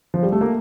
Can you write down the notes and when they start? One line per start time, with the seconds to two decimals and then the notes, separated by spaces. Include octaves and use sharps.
0.14 F3
0.23 G3
0.32 A3
0.41 A#3